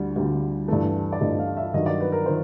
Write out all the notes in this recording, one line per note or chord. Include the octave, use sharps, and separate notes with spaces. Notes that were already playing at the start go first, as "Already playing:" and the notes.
Already playing: D2 D3 G3
D2 D3 G3
G2 E3 A3
D5
G2 E3 A3 D#5
F5
E5
G2 D#3 F#3 D#5
D5
B4
A#4
D#3 C5